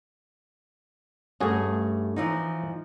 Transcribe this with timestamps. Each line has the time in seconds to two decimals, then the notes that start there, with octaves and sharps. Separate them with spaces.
1.40 G2 A3 C#4 F#4 G#4
2.16 E3 F3 D#4